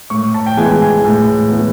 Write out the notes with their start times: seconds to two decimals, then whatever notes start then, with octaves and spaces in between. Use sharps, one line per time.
0.10 A2 C#6
0.34 A5
0.46 G5
0.57 E3 G#3 B3 G#5
0.82 G#5
1.05 A2
1.51 E3 G#3 B3